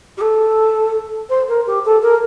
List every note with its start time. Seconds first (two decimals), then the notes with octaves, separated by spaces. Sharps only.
0.17 G4
0.21 A4
1.30 C5
1.48 A#4
1.67 G4
1.85 A4
2.02 A#4